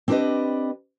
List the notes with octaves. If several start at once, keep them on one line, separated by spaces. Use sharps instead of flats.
C4 D4 G4 A4 B4 D#5